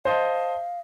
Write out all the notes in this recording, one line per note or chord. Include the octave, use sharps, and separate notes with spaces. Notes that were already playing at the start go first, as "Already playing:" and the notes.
C5 D#5 F5 A5